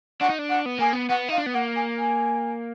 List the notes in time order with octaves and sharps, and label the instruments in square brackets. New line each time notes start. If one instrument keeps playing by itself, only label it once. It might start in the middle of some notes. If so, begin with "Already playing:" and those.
[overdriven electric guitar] D4 [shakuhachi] F#5
[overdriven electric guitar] D#4
D4
[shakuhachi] F#5
[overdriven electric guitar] B3
[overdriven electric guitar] A#3 [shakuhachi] G#5
[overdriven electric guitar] B3
[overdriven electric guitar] B3 [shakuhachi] F#5
[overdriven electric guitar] D#4 [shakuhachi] F5
[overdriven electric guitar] D4
B3
[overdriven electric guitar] A#3 [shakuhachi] F#5
[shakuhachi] G#5
G#5